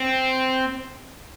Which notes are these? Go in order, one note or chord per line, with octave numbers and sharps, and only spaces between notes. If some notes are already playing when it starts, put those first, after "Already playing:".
Already playing: C4